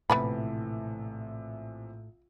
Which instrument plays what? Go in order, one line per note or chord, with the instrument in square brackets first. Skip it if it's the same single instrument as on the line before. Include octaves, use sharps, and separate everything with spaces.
[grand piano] A#1 C3 E3 [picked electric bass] A2 [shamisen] B3 B4 B5